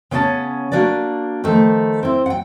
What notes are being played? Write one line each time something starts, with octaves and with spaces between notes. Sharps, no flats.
C#3 B3 C#4 D5 A5
A#3 D4 F#4 B4 D5
D#3 F3 A3
C4 E4
F#5 G5